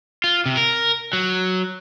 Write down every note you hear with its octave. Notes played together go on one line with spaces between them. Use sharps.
F4
C3
A#4
F#3